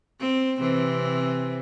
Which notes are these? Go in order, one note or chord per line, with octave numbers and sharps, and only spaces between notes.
C4
C3 E3 C4